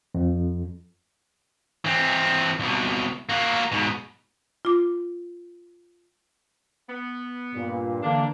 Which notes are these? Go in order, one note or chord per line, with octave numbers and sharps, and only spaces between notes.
F2
E3 C4
C2 B2
A#3 F#4
G#2 B2
F4 D6
B3
G2 A#2
D3 E3 A#3 D4